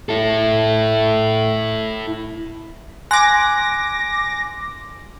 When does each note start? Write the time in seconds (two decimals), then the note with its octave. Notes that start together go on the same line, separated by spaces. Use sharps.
0.09 E4 A4
3.11 G#5 C6 D6 F#6 A#6